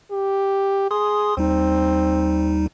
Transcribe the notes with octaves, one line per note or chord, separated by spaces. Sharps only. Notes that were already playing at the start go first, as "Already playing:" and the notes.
G4
G#4 C6 D#6
D#2 G3 C4 D#4